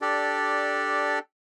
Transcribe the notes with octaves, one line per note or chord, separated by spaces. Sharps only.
D4 G4 A4 D5